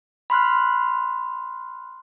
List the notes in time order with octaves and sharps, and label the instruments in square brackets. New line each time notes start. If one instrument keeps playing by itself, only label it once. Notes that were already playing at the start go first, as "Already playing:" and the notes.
[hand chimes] B5 C6 F6 F#6